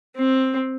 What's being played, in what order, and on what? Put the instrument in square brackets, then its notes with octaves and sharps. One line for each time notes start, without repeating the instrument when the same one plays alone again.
[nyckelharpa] C4